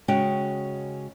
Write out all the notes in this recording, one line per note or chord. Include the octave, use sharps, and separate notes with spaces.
C#3 G#3 C#4 F#4 G5